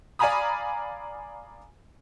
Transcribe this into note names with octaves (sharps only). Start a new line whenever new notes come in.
D5 F5 G#5 A#5 B5 D#6